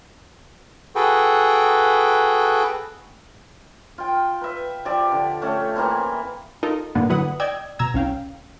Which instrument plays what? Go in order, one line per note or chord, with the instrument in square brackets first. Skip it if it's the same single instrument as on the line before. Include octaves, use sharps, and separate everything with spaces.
[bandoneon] F#4 G#4 A4 B4 G5
[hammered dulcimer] F4 G5
B4 E5
F3 G4 D5 E5
D3
A3 C#4 A4
E3 A#3 C4 E4
[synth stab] D#4 F4 A4 A#4 D#5
G2 A#2 D3 A#3 B3
D3 F#3 E4 B4 F#5 D#6
D5 D#5 G5 E6 G#6
B2 A#5 E6 G#6
C2 C#4 F5 G5